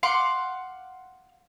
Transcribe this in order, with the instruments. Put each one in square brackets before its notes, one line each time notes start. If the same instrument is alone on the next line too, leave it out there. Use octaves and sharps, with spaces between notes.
[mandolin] F5 F#5 C6 D6